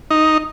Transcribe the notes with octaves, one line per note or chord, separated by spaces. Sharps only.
D#4